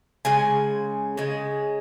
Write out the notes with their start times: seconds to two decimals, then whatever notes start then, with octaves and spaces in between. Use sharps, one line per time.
0.25 C#3 G#3 G#5
1.17 C#3 G#3